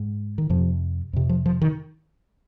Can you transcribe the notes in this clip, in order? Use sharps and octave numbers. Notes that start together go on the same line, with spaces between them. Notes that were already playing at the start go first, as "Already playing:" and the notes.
Already playing: G#2
D#3
F2 C3 F3
F2 C3
F3
F3
D#3